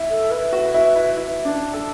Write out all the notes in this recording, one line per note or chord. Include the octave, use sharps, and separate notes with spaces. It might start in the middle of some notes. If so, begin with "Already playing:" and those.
Already playing: E4
A4
E4 B4
F#4
E4
E4
E4
D4
A4